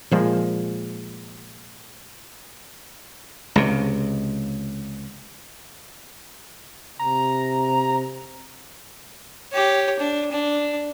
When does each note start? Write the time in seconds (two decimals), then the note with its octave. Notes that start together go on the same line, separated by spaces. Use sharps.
0.11 A#2 F3 G#3
3.56 C#2 C3
6.99 C3 A#5
9.52 G4 C#5
9.99 D4
10.32 D4